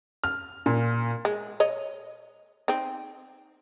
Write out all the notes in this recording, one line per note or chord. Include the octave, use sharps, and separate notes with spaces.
F6
A#2
G#3
C#5 D#5
C4 D#4